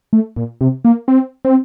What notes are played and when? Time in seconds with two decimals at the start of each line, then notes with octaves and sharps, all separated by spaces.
0.13 A3
0.36 A#2
0.61 C3
0.85 A#3
1.08 C4
1.45 C4